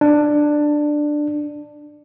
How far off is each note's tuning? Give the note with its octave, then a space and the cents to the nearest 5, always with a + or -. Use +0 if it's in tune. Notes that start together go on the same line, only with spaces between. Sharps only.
D4 +10